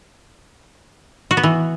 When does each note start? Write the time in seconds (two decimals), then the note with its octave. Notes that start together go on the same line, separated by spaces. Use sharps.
1.31 F#4
1.37 B3
1.43 E3